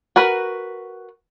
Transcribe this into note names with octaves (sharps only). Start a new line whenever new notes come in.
F#4 A#4 B4